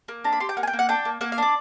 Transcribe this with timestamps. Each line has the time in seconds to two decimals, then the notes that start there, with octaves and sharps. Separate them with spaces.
0.08 A#3
0.24 D4 A#5
0.33 B5
0.40 G4 C6
0.49 G5
0.57 A#3 F#5
0.63 G#5
0.67 G5
0.73 A#3
0.79 F#5
0.89 D4 G5
1.05 A#3
1.21 A#3 F#5
1.32 F5
1.38 D4 D5